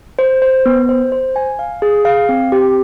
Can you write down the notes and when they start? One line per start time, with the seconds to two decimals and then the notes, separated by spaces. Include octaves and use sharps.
0.19 C5
0.42 C5
0.66 B3
0.89 C5
1.12 C5
1.36 G#5
1.59 F5
1.82 G#4
2.05 F5
2.29 C4
2.52 G4